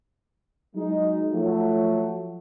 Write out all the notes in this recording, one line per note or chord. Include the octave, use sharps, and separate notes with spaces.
F#3 G#3 D#4
F3 F#3 A3